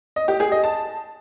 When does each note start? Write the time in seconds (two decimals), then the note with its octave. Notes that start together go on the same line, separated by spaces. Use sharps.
0.16 D#5
0.28 G4
0.40 G#4
0.52 D#5
0.63 A5